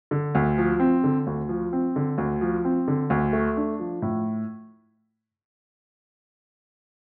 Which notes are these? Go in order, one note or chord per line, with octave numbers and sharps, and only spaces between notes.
D3
D2
F3
C4
D3
D2
F3
C4
D3
D2
F3
C4
D3
D2
A3
D4
F3
A2